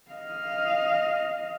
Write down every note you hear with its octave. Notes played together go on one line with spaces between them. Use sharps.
D#5 F5